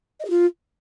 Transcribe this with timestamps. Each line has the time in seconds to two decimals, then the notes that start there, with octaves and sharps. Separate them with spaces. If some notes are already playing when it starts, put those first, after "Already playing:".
0.19 D#5
0.24 G#4
0.29 F4